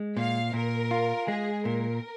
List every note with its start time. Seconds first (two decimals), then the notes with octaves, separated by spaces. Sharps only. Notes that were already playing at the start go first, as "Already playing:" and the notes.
Already playing: G#3
0.17 A#2 F5
0.54 A#2 A#4
0.91 F4
1.28 G#3 G#4
1.64 A#2 A#4